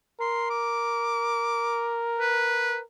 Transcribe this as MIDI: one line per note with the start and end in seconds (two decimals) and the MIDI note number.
0.21 2.83 70
0.21 0.50 84
0.50 2.01 86
2.19 2.78 71